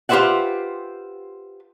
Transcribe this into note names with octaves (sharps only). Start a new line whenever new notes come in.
F4 G4 B4 C5 E5 F#5